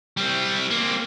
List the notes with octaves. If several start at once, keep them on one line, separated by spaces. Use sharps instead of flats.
G3 C4
A#3 C4